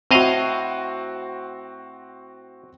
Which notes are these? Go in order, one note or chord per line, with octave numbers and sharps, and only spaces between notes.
A2 C4 F#4 D#5 F5